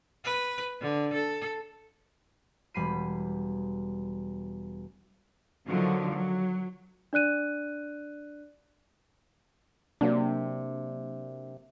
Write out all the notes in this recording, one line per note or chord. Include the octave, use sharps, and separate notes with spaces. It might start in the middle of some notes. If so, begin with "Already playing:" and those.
B4
D3
A4
E1 G3 B5 C7 D#7
D3 D#3 F3 F#3
F#3
D4 D5 F#6 D#7
C3 F#3 A#3 D4